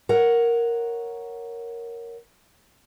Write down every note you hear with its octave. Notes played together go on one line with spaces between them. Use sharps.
A#4 C#5 F#5